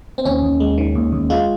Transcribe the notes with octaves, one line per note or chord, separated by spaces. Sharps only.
C4
D#2 C#4
D#2
G#3
D#3
D#2
D#2
G#3 F4